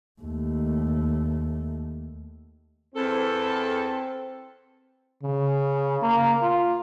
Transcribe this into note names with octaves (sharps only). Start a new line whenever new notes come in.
D#2 A3
E2 C4 A4
C#3
A#3
F4